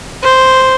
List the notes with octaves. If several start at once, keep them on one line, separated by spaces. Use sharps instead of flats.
C5